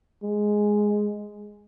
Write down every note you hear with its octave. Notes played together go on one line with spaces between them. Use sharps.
G#3